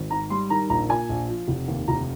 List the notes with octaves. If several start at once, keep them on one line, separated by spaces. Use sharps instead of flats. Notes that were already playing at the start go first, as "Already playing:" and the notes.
Already playing: G#1
G#2 A#5
G3 C6
D#3 A#5
A#1 A#5
A#2 G#5
A#1
F3
F1
D#2
F1 A#5